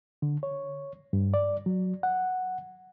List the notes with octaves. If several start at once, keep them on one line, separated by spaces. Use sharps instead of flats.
D3
C#5
G2
D5
F#3
F#5